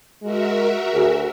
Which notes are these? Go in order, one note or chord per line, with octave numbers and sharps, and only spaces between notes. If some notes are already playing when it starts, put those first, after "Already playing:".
G#3 F#4 A#4 E5
D2 G#4